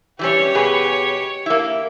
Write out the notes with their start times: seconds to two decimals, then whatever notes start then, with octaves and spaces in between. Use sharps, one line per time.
0.19 E3 G3 C#4 G4 C#5
0.55 B2 G#4 B4
1.46 A#3 E4